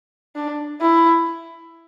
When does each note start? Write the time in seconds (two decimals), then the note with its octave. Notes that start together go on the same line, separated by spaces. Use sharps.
0.35 D4
0.81 E4